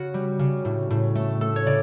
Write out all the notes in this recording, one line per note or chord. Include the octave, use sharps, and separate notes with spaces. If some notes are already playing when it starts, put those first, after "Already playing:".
Already playing: C#3 F#4
G3
C#3
A2
A2
A3
A3 A4
C#5
C#3 D5